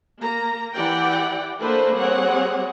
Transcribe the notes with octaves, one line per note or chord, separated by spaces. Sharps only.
A#3 A#5
E3 G4 D5 F#5 G5
A3 A#3 D4 A4 B4 C5
G3 C4 G#4 C#5 F#5